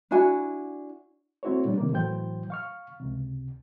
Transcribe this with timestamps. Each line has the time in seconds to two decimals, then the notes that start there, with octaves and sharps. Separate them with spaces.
0.11 D4 E4 F#4 G#5
1.43 A3 C4 E4 F#4 C5 C#5
1.65 A#2 G3 D4
1.78 C3 D#3 A#3
1.93 A2 E3 F#3 C5 G5 G6
2.50 F5 C#6 F6
3.00 C#2 C3